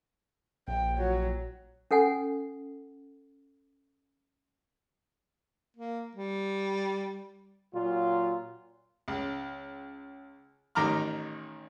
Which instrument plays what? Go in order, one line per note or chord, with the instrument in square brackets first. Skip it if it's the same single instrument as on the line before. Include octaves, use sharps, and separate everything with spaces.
[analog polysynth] A#1 [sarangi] G5
[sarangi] F#3
[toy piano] C#4 A4 F#5 G#5
[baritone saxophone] A#3
G3
[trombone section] A#2 F#3 F4
[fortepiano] C#2
A1 D#3 A#5 D6 F6